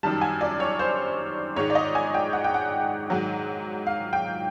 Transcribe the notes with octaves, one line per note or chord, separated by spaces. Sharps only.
F#2 D#3 G3 A5
G#5
D5
C#5
C5
G#2 D#3 G#3 C#5
D5
D#5
G#5
G5
F#5
G5
F#5
G#2 D#3 F#3
F5
G5